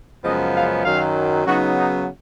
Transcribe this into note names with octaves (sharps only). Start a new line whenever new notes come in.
F#2 C#3 F3 G#3 B3 D#5
F5
F#2 D#3 F#3 F5
C#3 F#3 B3 D#4 F#4
D#4